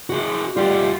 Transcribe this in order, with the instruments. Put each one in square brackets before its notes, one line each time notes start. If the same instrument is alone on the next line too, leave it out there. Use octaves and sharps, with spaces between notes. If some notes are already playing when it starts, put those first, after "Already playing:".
[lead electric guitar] F#4 G#4
[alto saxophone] G3 [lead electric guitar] F4 G4